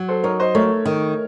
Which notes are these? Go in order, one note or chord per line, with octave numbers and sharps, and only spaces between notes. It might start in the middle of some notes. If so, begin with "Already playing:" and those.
Already playing: F#3
A4 C5
D#4 A#4 C#5
C5 D#5
A3 A#4 C#5
D#3